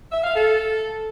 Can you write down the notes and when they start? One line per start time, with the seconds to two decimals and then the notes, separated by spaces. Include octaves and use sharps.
0.11 E5
0.23 F5
0.35 A4